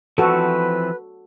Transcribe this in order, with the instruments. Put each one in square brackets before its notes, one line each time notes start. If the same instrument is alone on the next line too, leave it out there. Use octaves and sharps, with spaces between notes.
[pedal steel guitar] E3 F3 C4 [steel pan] F#4 A4 [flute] B4